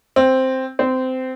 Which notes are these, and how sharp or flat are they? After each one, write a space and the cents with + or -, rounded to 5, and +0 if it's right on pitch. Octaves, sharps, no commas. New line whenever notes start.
C4 +0
C4 -20